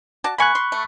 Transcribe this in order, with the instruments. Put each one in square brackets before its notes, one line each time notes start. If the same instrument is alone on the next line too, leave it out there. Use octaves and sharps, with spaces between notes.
[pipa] F#4 D5 A5
[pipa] A#3 G#5 [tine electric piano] B5 C#6 F#6
[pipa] C6
A3